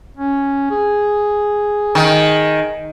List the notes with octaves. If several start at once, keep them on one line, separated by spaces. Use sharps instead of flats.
C#4
G#4
D#3